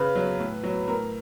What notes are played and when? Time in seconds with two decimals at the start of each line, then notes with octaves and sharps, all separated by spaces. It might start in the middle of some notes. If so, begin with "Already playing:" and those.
Already playing: C#3 B4
0.15 F#3
0.39 A2
0.63 F#3
0.88 A2 A#4